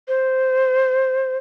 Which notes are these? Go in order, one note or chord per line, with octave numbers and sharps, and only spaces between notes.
C5